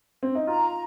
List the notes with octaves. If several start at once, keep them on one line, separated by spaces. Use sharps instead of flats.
C4
D#4
F4 A#5